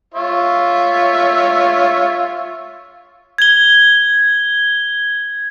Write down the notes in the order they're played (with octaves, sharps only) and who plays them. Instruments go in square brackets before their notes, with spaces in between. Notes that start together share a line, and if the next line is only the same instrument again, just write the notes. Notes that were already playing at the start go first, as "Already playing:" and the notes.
[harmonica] F4 C#5 E5
[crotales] G#6 G7